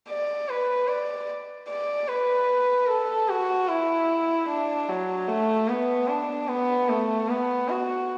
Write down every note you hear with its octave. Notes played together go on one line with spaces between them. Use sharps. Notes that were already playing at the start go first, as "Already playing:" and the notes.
D5
B4
D5
D5
B4
A4
F#4
E4
D4
F#3
A3
B3
D4
B3
A3
B3
F#4